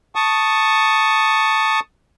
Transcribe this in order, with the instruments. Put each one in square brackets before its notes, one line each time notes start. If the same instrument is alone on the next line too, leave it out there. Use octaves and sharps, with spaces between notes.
[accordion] A5 C#6 D#6